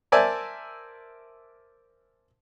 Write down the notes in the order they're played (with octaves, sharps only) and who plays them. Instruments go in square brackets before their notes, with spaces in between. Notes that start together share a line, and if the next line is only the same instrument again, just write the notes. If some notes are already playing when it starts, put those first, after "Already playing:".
[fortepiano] A#4 C5 D5 E5 G#5 A5